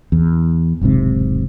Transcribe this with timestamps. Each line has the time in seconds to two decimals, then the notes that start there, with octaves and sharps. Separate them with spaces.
0.12 E2
0.81 E1 B1 G#2 C3